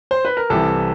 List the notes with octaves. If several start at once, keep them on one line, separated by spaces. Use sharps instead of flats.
C5
B4
A#4
C2 C3 E3 A4